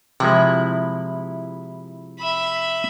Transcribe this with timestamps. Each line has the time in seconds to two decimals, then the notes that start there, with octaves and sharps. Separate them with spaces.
0.20 C3 F3 G#3 E4
2.20 E5 B5